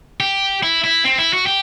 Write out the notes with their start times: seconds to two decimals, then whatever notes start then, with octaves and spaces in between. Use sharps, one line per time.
0.20 G4
0.63 E4
0.84 E4
1.05 C4
1.19 E4
1.33 F#4
1.46 G4